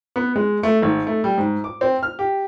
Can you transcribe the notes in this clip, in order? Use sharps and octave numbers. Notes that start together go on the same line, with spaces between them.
B3
G#3
A3
G#1
A3
G3
G#2
D6
C4
F6
G4